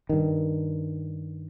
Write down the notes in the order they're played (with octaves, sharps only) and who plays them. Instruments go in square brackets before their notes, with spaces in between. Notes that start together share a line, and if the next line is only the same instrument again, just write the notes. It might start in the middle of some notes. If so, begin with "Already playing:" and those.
[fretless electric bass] G2 D#3